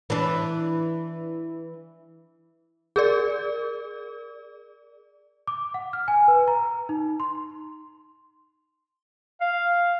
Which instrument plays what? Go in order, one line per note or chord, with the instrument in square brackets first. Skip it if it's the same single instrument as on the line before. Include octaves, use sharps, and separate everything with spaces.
[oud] E3 D4
[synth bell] G#4 A#4 D5
[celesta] D6
F#5
F6
G#5
B4
A#5
D#4
C6
[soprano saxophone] F5